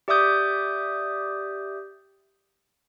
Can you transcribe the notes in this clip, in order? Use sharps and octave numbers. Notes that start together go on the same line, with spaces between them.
G4 D5 E5 D6 D#6 G6